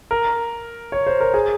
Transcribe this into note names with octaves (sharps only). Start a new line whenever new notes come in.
A#4
C#5
C5
A#4
G#4